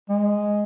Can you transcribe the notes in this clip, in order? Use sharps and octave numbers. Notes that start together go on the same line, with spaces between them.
G#3